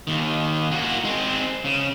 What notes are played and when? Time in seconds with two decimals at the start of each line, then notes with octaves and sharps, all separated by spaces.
0.07 D#2 D#3
0.71 A#3 F#4
1.05 G#3 C4
1.65 C#3